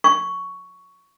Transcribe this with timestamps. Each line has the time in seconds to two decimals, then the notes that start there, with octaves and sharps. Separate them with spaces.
0.04 C#6